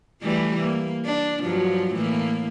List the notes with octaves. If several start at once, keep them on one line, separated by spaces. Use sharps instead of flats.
E3 G3 A3
A#3
D4
G2 F3 F#3
A2 E3 A#3